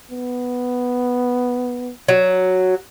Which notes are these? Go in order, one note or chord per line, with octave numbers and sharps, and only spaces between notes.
B3
F#3